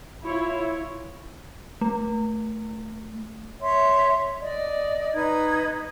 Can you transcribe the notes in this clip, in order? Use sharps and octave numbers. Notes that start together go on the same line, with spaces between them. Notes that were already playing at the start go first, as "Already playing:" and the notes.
E4 F4 C#5
A3
C#5 E5 C6
D5 D#5
D#4 B4 G#6